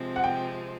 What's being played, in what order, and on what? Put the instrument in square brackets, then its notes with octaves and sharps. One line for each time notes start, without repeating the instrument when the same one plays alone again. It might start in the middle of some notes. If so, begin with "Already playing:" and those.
Already playing: [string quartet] C3 F3 G#3 C4
[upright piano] F#5
G5